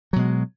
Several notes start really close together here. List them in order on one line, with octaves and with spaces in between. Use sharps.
F#3 B2 G#3